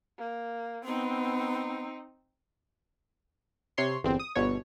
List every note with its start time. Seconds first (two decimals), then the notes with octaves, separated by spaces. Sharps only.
0.18 A#3
0.84 B3 C4 D#4
3.77 C3 C#5 C6 C7
4.03 G1 E2 C4
4.19 D#6
4.35 G1 B2 C#5